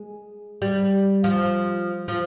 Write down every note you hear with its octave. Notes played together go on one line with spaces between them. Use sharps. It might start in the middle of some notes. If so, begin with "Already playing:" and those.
Already playing: G#3
G3
F3
F3